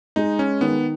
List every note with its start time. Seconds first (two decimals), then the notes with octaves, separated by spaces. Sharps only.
0.16 G#3 D#4
0.39 C#4
0.61 D#3 B3